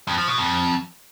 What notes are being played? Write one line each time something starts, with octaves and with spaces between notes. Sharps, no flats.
F2
F3
B2
F2